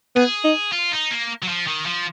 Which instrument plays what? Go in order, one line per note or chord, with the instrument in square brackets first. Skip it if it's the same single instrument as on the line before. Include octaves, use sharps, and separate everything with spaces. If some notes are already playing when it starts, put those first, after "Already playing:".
[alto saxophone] B3 [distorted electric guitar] G#4
[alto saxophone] D#4
[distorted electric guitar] F4
D#4
A#3
F#3
F3
D#3
F3